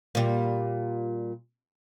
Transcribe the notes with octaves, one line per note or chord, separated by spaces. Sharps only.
A#2 G3